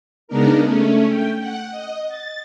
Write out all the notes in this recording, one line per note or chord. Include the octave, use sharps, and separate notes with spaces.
C#3 G#3 B3 D4 D#4 A#4
A3 C#4
G5
F#5
D#5
A6